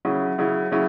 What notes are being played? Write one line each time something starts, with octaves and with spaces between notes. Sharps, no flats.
C#3 F#3 C#4 E4
C#3 F#3 C#4 E4
C#3 F#3 C#4 E4